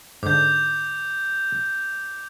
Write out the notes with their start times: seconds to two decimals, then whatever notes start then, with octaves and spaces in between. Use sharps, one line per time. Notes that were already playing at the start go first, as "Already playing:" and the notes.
0.23 G#2 D3 D6 G6